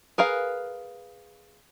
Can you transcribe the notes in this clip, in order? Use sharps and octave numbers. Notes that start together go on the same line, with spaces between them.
G#4 A#4 B4 F5